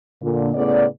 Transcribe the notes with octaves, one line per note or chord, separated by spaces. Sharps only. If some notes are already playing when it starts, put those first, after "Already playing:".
A#2 D3
A2 C#3 B3 D5